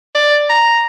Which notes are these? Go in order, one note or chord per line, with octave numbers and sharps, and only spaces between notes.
D5
A#5